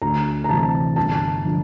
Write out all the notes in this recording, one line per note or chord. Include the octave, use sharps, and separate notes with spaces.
D2 A#5
A#5
C3 E3 A5
G1 A5
D3 F3